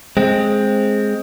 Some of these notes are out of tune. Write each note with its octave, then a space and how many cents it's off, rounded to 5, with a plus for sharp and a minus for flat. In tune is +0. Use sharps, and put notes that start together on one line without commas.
G#3 +5 C4 +10